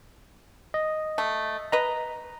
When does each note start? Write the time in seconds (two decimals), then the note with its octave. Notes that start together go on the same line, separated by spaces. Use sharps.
0.74 D#5
1.18 A3
1.72 B4 D#5 A#5